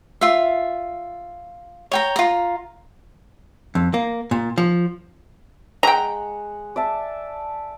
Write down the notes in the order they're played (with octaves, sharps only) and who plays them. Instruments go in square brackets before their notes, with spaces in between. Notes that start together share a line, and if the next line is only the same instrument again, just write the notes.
[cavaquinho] F4 E5
C#5 G5 A#5
F4 A#5
[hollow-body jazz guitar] F2
A#3
A#2
F3
[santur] G#3 F#5 [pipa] G5 A#5
[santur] D5 E5 A5